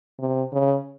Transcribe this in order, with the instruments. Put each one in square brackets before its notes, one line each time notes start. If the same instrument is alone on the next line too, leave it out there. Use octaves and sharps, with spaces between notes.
[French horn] C3
C#3